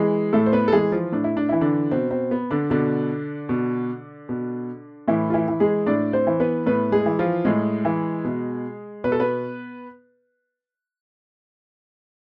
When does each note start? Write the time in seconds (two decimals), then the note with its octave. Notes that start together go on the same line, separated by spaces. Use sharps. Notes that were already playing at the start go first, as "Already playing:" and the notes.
Already playing: E3 G#3 G#4
0.33 A2 A3 A4
0.46 C5
0.52 B3 B4
0.68 A4
0.72 E3 G#3 G#4
0.92 F3 F4
1.12 A2 D4
1.24 E4
1.37 D4
1.49 E3 E4
1.61 D3 D4
1.91 B2 C4
2.11 C4
2.31 B3
2.51 D3 D4
2.70 B2 D3 D4
3.49 B2
4.29 B2
5.08 A2 E3 E4
5.30 F4
5.34 E3 E4
5.48 E3
5.60 G#3 G#4
5.86 A2 D4 D5
6.13 C4 C5
6.27 E3
6.40 B3 B4
6.66 A2 B3 B4
6.92 G#3 G#4
7.06 E3
7.19 F3 F4
7.45 A2 G#3 G#4
7.85 E3
8.24 B2
9.04 B2 B4
9.12 A4
9.20 B3 B4